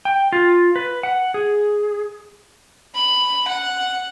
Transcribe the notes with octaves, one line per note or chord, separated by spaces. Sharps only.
G5
F4
B4
F#5
G#4
B5
F#5